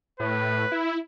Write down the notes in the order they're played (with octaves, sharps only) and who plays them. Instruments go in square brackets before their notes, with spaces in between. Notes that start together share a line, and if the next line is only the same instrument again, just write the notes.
[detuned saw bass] A2 [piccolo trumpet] B4
[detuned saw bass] E4